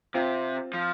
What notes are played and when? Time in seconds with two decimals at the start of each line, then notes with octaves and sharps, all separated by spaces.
0.14 C3 C4 F4
0.74 F3